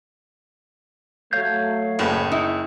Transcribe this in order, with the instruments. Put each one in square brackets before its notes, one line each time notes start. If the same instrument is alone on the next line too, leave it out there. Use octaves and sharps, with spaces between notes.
[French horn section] F#3 A3 [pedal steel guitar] C#5 F5 G6
[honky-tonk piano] F#1 [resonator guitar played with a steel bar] A2 B3
[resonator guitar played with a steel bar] D#4 E4